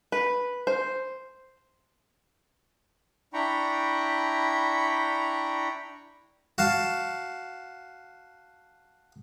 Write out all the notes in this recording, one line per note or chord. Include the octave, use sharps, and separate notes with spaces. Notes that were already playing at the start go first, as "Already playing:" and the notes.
B4
C5
D4 E4 G5 A#5 B5 C#6
F#4 F5 A5